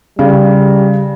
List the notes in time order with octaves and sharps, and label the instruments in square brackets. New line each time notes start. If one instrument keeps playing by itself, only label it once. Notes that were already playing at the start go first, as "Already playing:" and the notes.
[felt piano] C#3 [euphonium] G3